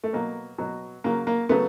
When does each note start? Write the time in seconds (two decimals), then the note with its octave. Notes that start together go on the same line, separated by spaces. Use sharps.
0.04 A3
0.13 B2 F#3 A#3
0.58 B2 F#3
1.04 C#3 F#3 A#3
1.27 A#3
1.49 C#3 F#3 A3 B3